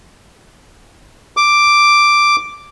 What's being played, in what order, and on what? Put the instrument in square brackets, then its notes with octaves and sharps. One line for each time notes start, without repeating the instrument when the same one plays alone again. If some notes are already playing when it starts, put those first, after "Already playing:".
[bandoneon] D6